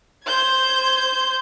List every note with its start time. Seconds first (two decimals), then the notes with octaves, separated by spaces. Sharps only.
0.24 C5 G6 G#6